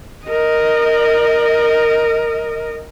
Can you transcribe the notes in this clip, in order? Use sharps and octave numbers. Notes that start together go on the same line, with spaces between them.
A#4 D#5